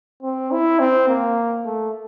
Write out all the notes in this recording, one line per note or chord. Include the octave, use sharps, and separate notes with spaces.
C4
E4
C4
A#3
A3